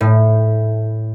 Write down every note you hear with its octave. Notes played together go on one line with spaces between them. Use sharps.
A2